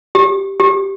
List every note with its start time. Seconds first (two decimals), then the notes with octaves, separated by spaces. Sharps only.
0.15 G4
0.60 G4